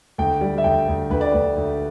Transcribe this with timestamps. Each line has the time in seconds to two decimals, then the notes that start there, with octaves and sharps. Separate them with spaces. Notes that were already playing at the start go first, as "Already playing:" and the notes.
0.18 D2 G5
0.41 G3
0.58 E5
0.64 D2 G5
0.88 D2
1.10 D2 B4
1.21 D5
1.31 D2 B4
1.57 D2